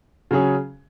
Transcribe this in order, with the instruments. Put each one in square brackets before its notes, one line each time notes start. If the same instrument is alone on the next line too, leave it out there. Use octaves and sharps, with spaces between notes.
[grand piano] C#3 F#3 C#4 G#4